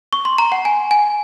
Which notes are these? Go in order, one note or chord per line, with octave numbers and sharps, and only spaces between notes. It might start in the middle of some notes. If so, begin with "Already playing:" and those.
C#6
C6
A#5
F#5
G#5
G#5